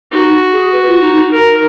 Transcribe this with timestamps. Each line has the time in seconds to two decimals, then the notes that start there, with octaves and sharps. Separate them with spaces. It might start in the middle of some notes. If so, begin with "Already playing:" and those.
0.12 D#4 F#4
0.52 G#4
0.72 B4
0.87 F4
1.01 D#4
1.17 D#4
1.31 A#4